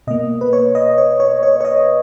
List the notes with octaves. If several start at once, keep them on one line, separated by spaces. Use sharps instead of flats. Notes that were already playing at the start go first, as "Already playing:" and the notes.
B2 A#3 D#5
B4
C#5
D#5
C#5
C#5
C#5
C#5
D#5